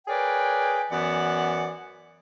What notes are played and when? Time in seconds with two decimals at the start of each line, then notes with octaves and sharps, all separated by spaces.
0.08 G#4 A#4 B4 C#5 D5 G5
0.91 F#2 E3 B3 D5 F#5